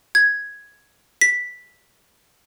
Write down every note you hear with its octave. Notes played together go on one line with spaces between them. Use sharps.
G#6
B6